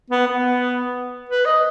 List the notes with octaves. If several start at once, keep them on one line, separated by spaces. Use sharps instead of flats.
B3
B3
B4
D#5